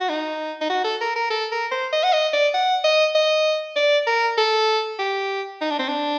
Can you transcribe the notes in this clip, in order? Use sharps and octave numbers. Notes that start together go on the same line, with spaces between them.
F#4
D#4
D#4
F#4
A4
A#4
A#4
A4
A#4
C5
D#5
F#5
D#5
D5
F#5
D#5
D#5
D5
A#4
A4
G4
D#4
D4
C4
D4